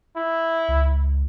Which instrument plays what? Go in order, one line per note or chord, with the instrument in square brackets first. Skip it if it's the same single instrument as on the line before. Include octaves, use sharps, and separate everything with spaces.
[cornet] E4
[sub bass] C#2